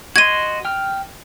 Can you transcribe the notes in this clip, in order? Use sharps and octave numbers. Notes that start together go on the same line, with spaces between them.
F#4 D#5 C6 G#6 D#7
G5 F6